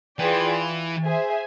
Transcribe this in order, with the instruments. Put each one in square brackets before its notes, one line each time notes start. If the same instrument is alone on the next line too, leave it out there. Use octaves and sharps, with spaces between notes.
[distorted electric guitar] E3 [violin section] F4 G#4 B4 D5 G5
[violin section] G#4 C5 E5 G#5